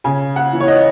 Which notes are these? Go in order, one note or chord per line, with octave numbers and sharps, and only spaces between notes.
C#3 G#5
F#5
E3
C#5
D#5